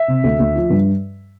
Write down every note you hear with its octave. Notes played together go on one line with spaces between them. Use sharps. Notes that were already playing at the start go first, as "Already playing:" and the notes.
Already playing: E5
C3
D2
D2
F3
G2